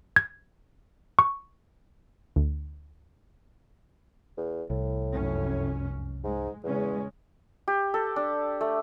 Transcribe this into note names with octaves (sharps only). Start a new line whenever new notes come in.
G#6
C#6
D2
E2
C2 A2
F1 F#2 C#4
G#2 G#3
E2 C#3 G#3 C#4
G4
A4
D4
A3